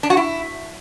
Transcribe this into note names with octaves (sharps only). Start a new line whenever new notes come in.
D4
F#4
E4